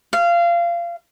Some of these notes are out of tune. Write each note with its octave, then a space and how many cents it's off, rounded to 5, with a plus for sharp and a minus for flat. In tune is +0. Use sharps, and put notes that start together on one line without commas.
F5 -25